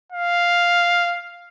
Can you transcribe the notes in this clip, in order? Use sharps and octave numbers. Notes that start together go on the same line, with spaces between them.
F5